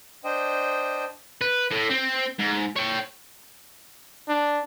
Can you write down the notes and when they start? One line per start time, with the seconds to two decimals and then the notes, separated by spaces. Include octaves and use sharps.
0.24 D4 C5 D#5 G5
1.41 B4
1.71 A2
1.90 C4
2.39 G#2
2.76 C#5 G5
4.28 D4